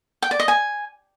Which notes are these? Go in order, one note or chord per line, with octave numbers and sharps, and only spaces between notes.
G5
D5
D#5
G#5